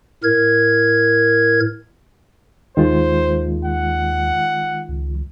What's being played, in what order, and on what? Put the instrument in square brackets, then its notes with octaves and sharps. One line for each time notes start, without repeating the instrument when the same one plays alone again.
[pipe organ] A2 A#4 G#6
[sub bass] D#2 [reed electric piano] D#3 G#3 F4 [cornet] C5
[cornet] F#5
[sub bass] C#2